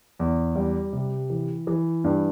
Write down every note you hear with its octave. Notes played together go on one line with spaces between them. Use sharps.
E2
G3
C3
E3
E3
G2